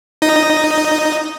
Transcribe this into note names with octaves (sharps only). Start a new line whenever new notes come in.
D#4 D#5